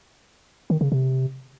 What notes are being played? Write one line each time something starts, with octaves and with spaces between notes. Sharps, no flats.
D#3
C#3
C3